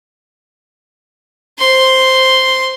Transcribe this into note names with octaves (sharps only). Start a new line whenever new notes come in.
C5 C6